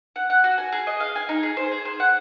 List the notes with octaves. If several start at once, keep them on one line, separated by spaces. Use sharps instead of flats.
F#5
F#5
F#4
G#5
G#4
D#5
F5
G#5
D#4
G#4
C5
G#4
C5
F#5